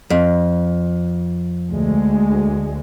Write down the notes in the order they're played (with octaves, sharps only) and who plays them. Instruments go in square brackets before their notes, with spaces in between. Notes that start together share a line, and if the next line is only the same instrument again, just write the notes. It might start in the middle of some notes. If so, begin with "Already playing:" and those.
[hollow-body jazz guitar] F2
[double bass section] D2 G#3